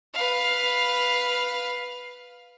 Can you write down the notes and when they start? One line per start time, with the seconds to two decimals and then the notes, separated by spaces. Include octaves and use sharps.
0.14 B4 F5